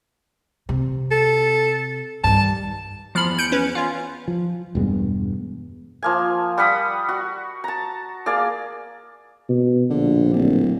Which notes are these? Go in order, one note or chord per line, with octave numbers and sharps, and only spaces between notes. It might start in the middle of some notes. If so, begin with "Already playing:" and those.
C3
A4
G2 D#3 A5
E2 F3 B5 F6
G6 C#7 D7
C#4 B4
C#4 F4
F3
E1 G2 G#3 B3
F3 A#3 G#5
G3 F#5 B5 D#6
F#4
A5 A#5
A#3 G#4 D5
B2
A#1 D3
D1